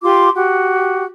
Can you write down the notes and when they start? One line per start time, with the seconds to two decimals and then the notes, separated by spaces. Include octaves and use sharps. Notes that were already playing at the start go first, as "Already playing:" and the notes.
0.03 F4 G4 C6 D6
0.35 F#4 G4